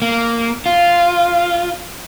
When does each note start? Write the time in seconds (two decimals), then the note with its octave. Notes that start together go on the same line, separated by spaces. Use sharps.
0.02 A#3
0.66 F4